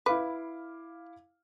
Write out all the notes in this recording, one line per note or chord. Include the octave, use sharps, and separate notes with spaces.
E4 B4 F5 D6